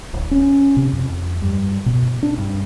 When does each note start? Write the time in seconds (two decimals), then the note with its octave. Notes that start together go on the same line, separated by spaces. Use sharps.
0.13 D1
0.31 C#4
0.76 C3
0.93 F2
1.42 G2
1.86 B2
2.23 D4
2.38 G2